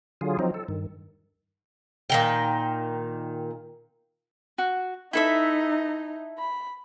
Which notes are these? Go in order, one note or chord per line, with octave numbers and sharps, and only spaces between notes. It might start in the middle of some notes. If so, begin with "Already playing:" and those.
D3 F#3 F4 G#4
F3 F#3 C4 D#4
A4
G2 D#3
A#2 D#3 G5
F#4
D#4 E4 A4 E5
B5